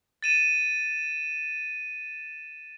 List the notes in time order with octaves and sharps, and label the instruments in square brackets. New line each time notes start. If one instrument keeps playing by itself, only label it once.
[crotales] A6 D#7 E7